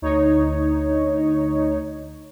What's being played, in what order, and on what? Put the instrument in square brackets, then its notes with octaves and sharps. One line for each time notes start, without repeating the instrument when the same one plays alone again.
[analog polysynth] D2 D#4 C#5